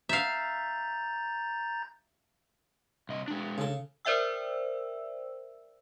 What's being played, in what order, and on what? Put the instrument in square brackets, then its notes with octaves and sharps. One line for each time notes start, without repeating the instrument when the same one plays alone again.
[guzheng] E5 F5 [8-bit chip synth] A#5 G6 A6
[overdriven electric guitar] C2 D#5
G#3 D4
[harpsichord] C#3 A4
[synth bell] A#4 C5 D5 E5 G5 E6